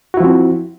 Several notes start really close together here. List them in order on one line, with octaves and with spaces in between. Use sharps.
F#4 E4 F3 C4